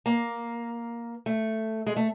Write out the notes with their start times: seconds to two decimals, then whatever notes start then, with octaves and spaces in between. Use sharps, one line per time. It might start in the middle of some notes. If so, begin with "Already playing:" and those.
0.06 A#3
1.26 A3
1.87 G#3
1.96 A3